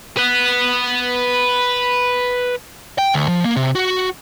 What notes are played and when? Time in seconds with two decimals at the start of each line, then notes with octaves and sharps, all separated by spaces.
0.17 B4 F#5
2.98 G5
3.14 D2
3.28 F3
3.44 A#3
3.56 C3
3.75 F#4